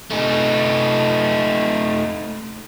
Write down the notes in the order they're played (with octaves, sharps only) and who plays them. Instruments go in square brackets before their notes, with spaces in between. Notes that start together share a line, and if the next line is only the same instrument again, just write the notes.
[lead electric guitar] A3 D#4